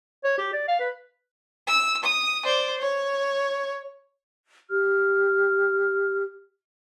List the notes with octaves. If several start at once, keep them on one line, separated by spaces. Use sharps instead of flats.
C#5
G4
D5
F5
B4
E6
D#6
C5 D5
C#5
G4 F6